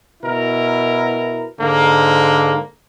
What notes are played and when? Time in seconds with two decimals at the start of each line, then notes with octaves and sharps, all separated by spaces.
0.22 B2 E4 A#4
1.60 G#2 D3 A#3